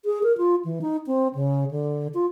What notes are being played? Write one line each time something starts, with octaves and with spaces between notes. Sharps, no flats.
G#4
A#4
F4
E3
D#4
C4
C#3
D3
F4